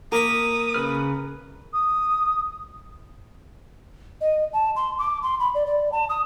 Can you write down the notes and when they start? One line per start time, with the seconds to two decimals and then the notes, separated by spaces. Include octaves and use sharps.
0.12 A#3 A#4 B5 D#6
0.74 C#3 B4 F6
1.73 D#6
4.21 D#5
4.53 A5
4.76 C6
4.99 D6
5.23 C6
5.40 B5
5.54 D5
5.66 D5
5.92 A5
6.09 D#6